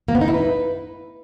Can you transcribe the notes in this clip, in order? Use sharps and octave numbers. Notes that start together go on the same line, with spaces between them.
A#3
B3
D#4
E4
B4